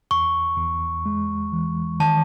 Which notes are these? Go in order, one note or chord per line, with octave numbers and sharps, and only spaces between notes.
E2 C#6
E2
G#3
E3
D#3 A5